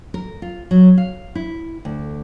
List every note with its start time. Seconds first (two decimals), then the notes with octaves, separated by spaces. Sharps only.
0.14 A#4
0.42 F4
0.71 F#3
0.98 F5
1.35 E4
1.85 D2